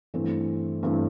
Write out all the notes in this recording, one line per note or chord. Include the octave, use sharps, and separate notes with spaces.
G2 E3 A3 C4
G2 E3 A3 C4